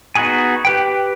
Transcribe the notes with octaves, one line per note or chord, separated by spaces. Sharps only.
B3 D#4 F#4 G#4 G#5
G4 B4 G5